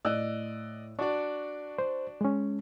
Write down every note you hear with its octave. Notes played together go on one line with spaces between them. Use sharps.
A2 D5 D#5 E6 F#6
D4 F#4 D5 A5 C#6
C5
G#3 C#4